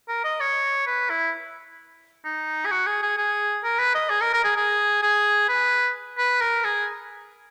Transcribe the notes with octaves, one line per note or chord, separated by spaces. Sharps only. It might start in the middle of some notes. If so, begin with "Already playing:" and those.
A#4
D#5
C#5
B4
E4
D#4
G#4
F#4
G#4
G#4
G#4
A#4
B4
D#5
G#4
A#4
A#4
G#4
G#4
G#4
B4
B4
A#4
G#4